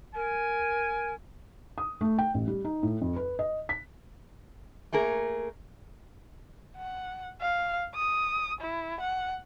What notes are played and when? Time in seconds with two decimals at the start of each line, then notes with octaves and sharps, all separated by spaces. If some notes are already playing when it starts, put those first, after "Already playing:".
0.15 A#4 G#5
1.78 D#6
2.01 A3
2.18 G5
2.34 A1
2.48 G3
2.65 D#4
2.83 A2
3.01 F2
3.16 B4
3.39 D#5
3.69 B6
4.93 A3 A#3 G#4 A#4
6.76 F#5
7.41 F5
7.95 D#6
8.60 E4
9.00 F#5